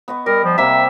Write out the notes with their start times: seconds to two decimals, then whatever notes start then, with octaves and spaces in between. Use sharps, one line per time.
0.08 B3 D#5 C#6
0.26 G3 A#4
0.44 F3
0.58 C3 A#3 G4 E5